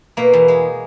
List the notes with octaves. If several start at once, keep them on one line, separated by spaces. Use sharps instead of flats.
B2 A#3
E2
G#3